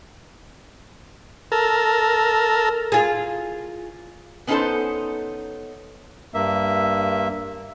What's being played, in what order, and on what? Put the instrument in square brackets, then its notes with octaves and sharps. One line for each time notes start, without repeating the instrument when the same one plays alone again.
[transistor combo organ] A4 A#4
[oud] F4 G#4
[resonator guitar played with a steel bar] B3 C#4 D#4 E4 A4 C5
[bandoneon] G2 A#3 E5